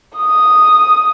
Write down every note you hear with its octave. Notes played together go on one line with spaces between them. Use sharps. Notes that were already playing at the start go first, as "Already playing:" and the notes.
D#6